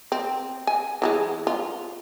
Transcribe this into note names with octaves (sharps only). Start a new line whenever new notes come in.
C4
G#5
E3 F#3 G#3
F4